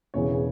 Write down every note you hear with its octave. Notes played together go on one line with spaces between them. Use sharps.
E1 E2 C#3 E3 B3 C#5